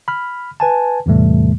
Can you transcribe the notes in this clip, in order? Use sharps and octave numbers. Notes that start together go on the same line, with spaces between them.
B5 F6
B4 G#5 A5
E2 A2 C3 E3 G3 A3